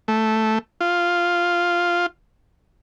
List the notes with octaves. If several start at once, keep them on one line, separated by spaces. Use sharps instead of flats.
A3
F4